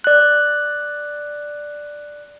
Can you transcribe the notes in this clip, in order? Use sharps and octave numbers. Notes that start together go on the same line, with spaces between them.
D5 F#6